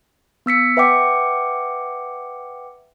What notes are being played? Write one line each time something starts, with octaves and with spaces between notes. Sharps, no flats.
B3 E6 B6 C#7
B4 E5 F#5 G5 D6 C#7